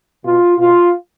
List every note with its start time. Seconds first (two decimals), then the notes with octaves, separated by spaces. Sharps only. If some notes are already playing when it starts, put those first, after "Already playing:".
0.24 B2 F4
0.58 B2 F4